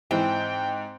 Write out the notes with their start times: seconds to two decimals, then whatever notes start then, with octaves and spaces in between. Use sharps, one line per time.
0.11 G#2 E3 C4 G5